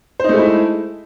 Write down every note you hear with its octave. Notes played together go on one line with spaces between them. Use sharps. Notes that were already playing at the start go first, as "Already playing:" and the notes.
G#3 A3 D#4 E4 C5